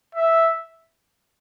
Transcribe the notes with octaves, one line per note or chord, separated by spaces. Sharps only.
E5